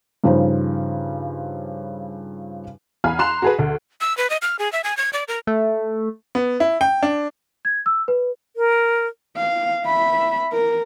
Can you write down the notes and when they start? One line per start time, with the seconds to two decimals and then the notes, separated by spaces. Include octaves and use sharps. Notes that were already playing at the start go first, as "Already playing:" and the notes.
0.24 G2 C#3 F3 D#4 C5
3.04 E2 F5 G#5 B5 F6
3.19 A#5 C6 F#6 E7 F7
3.42 F#4 G#4 B4
3.59 D2
4.01 E6
4.17 B4
4.30 D#5
4.42 F6
4.59 G#4
4.72 E5
4.84 G#5
4.97 G#6
5.13 D5
5.28 A#4
5.47 A3
6.35 B3
6.60 E4
6.81 G5
7.03 D4
7.65 G#6
7.86 E6
8.08 B4
8.56 A#4
9.37 F5
9.85 E5 B5
10.52 A#4